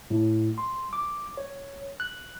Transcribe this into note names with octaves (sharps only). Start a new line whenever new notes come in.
A2
C6
D6
C#5
F#6